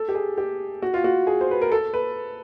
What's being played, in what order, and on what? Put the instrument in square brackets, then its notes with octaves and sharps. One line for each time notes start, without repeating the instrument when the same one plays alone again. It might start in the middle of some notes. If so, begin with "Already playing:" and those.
Already playing: [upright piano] A4
G4
G#4
G4
F#4
F4
F#4
G#4
C5
B4
A#4
A4
B4